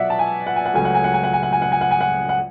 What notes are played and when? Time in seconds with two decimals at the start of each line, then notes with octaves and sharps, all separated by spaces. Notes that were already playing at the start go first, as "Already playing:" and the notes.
Already playing: B2 F#3 D5 E5 F#5
0.10 A5
0.19 G#5
0.47 F#5
0.56 G#5
0.66 F#5
0.74 C#2 C#3 F#3 A3 G#5
0.85 F#5
0.94 G#5
1.04 F#5
1.14 G#5
1.24 F#5
1.33 G#5
1.43 F#5
1.53 G#5
1.62 F#5
1.72 G#5
1.81 F#5
1.91 G#5
2.01 F#5
2.29 F#5